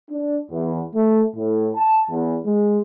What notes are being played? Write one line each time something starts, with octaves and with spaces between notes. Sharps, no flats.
D4
E2
A3
A2
A5
E2
G#3